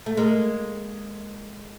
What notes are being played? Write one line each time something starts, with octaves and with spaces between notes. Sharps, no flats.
A3
G#3 A#3